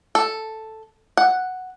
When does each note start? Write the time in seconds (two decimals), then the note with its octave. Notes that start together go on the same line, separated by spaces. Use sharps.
0.15 A4
1.17 F#5